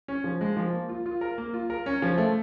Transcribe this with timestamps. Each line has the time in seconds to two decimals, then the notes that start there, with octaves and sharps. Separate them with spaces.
0.08 C#4
0.24 F3
0.41 G#3
0.57 F3
0.73 A#3
0.89 F4
1.06 F4
1.21 A#4
1.38 A#3
1.54 F4
1.70 A#4
1.86 C#4
2.02 F3
2.18 A3